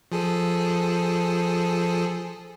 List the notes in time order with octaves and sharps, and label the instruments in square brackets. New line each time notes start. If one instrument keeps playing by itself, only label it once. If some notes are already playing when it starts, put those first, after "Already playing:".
[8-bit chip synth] F3 G#4 A4